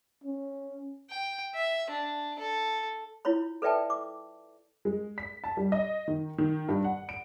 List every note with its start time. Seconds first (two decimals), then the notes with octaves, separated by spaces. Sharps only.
0.23 C#4
1.10 G5
1.54 E5
1.90 D4
2.39 A4
3.25 E4 F4 C#5 B5
3.62 A4 B4 D5 E5 G5 A5
3.90 D6
4.85 G#3
5.18 B6
5.44 A5
5.57 G3
5.72 D#5
6.08 D#3
6.38 D#3
6.68 G2
6.84 F#5
7.09 D7